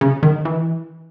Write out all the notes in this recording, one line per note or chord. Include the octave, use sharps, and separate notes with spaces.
C#3
D#3
E3